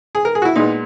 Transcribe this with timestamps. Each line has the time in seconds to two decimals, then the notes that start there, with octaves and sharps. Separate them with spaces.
0.15 G#4
0.25 A#4
0.35 G#4
0.42 F#4
0.45 E4
0.56 A#2 G#3 B3 D#4